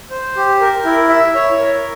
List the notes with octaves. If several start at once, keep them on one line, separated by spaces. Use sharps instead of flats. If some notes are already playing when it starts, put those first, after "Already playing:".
C5
G4
A#4
E4
E5
C#5
A#4